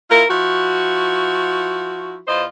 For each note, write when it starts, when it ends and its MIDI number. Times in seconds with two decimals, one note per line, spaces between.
0.09 0.22 58
0.09 0.22 64
0.09 0.22 65
0.09 0.22 70
0.28 2.18 53
0.28 2.18 64
0.28 2.18 66
2.26 2.43 40
2.26 2.43 65
2.26 2.43 72
2.26 2.43 75